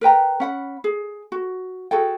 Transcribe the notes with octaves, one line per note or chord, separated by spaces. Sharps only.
A#4 B4 G5 A#5
C#4 F#5 B5
G#4
F#4
F#4 G#4 A4 G5